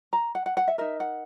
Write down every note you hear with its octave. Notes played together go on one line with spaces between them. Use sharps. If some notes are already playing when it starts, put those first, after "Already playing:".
A#5
F#5
F#5
F#5
E5
D#4 A#4 E5
F#5